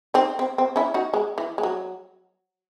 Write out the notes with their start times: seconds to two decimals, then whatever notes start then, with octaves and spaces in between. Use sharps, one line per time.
0.14 C4 D#4
0.39 C4
0.58 C4
0.76 C#4 E4
0.94 D#4 F#4
1.14 G#3
1.38 E3
1.58 G#3
1.63 F#3